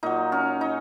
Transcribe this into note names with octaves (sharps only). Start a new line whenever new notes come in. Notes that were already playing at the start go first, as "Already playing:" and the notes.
A#2 F#3 D#4
C#4
D#4